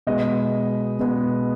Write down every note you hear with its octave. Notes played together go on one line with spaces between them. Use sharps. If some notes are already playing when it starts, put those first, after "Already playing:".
B2 G#3 B3 D#5
B2 G#3 B3